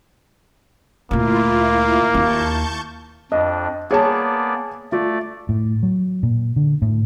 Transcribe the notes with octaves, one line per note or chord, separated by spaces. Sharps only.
D2 A#2 A#3 E4 F4
D#2 D#4 A5 C#6 G6
F2 D4 D#5
A#3 B3 G#4 C#5 D5 A5
A3 F4 D5
A2
F#3
A#2
D3
A2